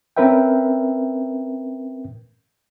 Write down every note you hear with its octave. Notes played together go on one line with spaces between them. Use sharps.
C4 C#4 A#4 B4 E5 G5